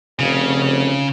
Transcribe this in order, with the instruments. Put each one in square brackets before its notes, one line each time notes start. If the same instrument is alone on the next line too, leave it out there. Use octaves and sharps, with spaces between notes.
[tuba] F1 [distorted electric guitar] C#3